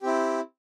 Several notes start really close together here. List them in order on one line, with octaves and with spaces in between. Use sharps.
G4 C4 E4